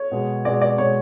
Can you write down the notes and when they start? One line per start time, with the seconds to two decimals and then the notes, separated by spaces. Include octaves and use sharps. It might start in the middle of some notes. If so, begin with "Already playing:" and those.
Already playing: C#5
0.11 B2 G#3
0.45 B2 G#3 D5
0.61 D5
0.78 B2 G#3 C#5